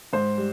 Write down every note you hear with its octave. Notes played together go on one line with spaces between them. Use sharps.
G#2 C5
G3